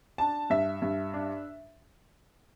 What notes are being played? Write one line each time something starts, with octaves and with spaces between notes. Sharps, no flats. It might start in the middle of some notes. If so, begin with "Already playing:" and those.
D4 A5
G2 E5
G2
D4